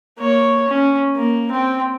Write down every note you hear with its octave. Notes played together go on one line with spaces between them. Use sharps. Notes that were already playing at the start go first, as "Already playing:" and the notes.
A#3 C#5
C#4
A#3
C4 G5